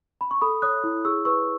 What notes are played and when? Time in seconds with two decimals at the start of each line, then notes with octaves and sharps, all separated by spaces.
0.21 B5
0.31 C#6
0.41 A4 B5 D#6
0.62 C#5 D#6 F#6
0.84 E4
1.05 G#4 C#6 E6
1.25 B4 C#6 E6